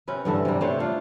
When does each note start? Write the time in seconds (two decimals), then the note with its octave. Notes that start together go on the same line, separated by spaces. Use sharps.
0.08 C3 C4 C#4 B4
0.25 G2 D3 E3 A4
0.45 C3 G3
0.61 A3 D4 C5 C#5
0.80 D4 F4